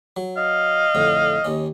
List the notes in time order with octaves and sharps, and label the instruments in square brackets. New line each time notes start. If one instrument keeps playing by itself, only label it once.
[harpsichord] F#3
[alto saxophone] D#5 [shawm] F5
[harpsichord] F2 A2 D3
D#2 C#4